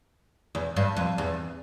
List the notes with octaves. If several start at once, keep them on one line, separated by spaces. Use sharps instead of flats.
E2
G2
F2
E2